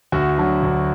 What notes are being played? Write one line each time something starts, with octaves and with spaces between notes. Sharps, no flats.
D2 F#4
D3 F#3
D2